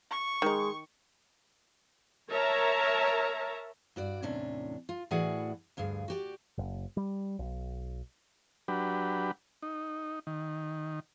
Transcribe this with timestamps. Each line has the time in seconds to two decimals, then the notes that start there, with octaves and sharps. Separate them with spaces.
0.11 C#6
0.42 D#3 G#3 D#4
2.29 A#4 C#5 E5 A5 A#5
3.96 G2 F#4 D5
4.22 E2 A2 C3 C#4 D4
4.89 F4
5.11 A2 E3 F#4 G#4 D5 F#5
5.77 D2 G2 F3 G#4
6.08 F#4 G4 D5
6.58 F#1
6.97 G3
7.39 B1
8.68 F#3 D4 G4 B4
9.62 D#4
10.27 D#3